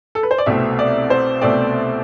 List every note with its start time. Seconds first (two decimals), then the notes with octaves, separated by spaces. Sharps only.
0.15 A4
0.23 B4
0.31 C5
0.38 D5
0.46 C2 B2 A3 C4 E5
0.79 D5
1.10 C5
1.42 C2 B2 A3 C4 D5